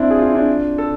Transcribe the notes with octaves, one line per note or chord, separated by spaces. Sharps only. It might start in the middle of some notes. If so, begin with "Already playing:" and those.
Already playing: C4 D4 E4
G#4
F4
E4
D4 F4
A4